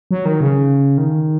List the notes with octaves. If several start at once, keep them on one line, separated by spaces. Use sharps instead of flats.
F#3
D#3
C#3
D#3